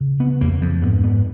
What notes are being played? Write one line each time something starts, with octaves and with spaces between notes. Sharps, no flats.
C#3
B3
F2 A#3
F3
G#2 B3
B3